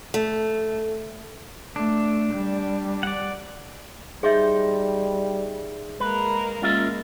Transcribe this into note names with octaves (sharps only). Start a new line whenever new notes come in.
A3
A3 D4
G3
D5 F#5
G3 D#4 G#4 C5 E5
G#3 A#3 A#4 B4
G#3 A#3 C#4 F4 E5